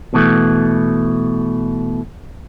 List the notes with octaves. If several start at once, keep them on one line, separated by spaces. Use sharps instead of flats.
B2 E3 A3